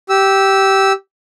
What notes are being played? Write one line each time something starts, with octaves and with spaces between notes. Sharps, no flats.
G4 E6